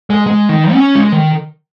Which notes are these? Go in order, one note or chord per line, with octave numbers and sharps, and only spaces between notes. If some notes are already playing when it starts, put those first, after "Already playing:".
G#3
G#3
D#3
C#4
G#3
D#3